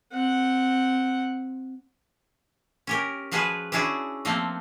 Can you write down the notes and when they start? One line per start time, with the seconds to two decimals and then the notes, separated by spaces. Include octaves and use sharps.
0.13 C4 F#5
2.87 C#4 G4 A#4
3.32 F3 G#3 F#4 G#4 B4
3.72 C#4 D4 E4 F#4 G#4
4.25 F3 A3 A#3 C4